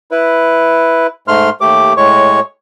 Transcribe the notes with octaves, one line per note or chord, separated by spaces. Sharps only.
E4 B4
G#2 A3 C6 F6
D#2 A3 G4 D6
A2 G#3 C#5 C#6